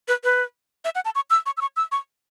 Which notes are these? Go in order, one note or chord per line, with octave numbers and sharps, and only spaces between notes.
B4
B4
E5
F#5
A5
C#6
E6
C#6
E6
C#6
E6
C#6